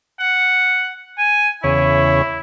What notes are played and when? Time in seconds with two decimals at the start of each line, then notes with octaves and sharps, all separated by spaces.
0.20 F#5
1.18 G#5
1.64 E2 C#3 E4 C#5